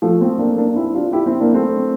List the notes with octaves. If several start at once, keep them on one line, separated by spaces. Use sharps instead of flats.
F3 A3
A3 C4
A#3 D4
A#3 D4
D4
C4 E4
D4 F4
E4 G4
C4 E4
A#3 D4
A3 C4